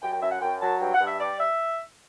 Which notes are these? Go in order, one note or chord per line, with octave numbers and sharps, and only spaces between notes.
F#2 G5
G5
F#2 E5
F#5
F#2 G5
F#3 A5
G2 G5
F#5
G2
E5
G3 D5
E5